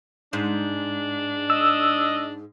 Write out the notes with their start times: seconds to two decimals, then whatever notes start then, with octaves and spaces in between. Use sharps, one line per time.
0.33 G#2 D4
1.50 D#5 E6